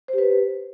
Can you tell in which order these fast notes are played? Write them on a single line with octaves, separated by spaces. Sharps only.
C5 G4 B4